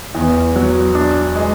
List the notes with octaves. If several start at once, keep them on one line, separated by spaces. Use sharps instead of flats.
E2
F#3
D4
G#3